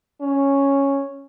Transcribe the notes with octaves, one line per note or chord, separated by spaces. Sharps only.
C#4